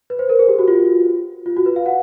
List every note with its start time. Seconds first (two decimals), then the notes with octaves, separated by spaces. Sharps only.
0.10 B4
0.19 C5
0.29 A#4
0.39 G#4
0.48 G4
0.59 F#4
0.68 F4
1.46 F4
1.57 F#4
1.66 B4
1.76 F5
1.86 F#5